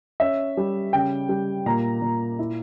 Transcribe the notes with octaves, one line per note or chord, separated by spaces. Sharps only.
C#4 E5
G3
C#3 G5
G3
A#2 A#5
A#2
E4